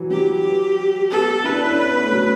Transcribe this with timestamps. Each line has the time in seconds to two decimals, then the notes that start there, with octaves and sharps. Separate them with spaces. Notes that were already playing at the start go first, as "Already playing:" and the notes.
Already playing: E3 F#3
0.10 F#3 G4
1.11 B3 A4
1.44 E4 B4
1.53 D4
1.61 C#4
1.70 D4
1.78 C#4
1.87 B3
1.96 C#4
2.03 A3
2.12 F#3